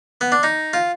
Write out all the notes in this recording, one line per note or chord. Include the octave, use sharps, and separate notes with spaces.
B3
D4
D#4
F4